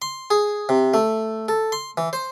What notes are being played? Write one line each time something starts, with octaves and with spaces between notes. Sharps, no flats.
C6
G#4
C3
A3
A4
C6
E3
C5